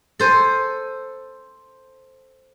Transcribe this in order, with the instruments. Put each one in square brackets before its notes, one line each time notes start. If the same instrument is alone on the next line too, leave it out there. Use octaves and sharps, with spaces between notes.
[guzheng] A4 C5 G#5